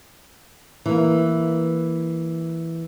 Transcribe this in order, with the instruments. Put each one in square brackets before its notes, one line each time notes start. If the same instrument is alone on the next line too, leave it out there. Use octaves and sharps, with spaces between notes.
[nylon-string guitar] E3 A#3